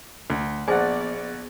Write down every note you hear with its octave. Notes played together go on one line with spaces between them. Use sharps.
D2
A#1 B3 G#4 C5 D5 F#5 G#5